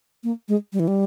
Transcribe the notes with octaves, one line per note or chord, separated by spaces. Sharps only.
A#3
G#3
G3
E3
G3